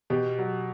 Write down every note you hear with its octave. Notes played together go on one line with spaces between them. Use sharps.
B2 G4
F#3